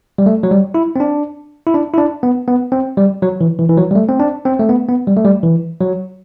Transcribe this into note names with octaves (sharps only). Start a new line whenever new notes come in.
G3
A3
F#3
G3
E4
C4
D4
E4
D4
E4
D4
B3
B3
C4
G3
F#3
E3
E3
E3
F#3
G3
A3
C4
D4
C4
A3
B3
B3
G3
A3
G3
E3
F#3